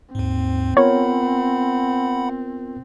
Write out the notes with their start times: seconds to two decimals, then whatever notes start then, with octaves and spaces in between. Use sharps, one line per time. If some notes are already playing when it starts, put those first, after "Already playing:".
0.15 D#2 G#2 C4
0.77 B3 F4 A#4 C#5 F#5 B5